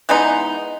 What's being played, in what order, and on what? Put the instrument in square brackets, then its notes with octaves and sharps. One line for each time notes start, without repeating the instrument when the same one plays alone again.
[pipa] E3 G#3 B3 D#4